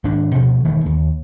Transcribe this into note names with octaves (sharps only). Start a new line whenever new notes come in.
G#1 D4
D2 B2 F3
E1 D#3 E3 A3
D#2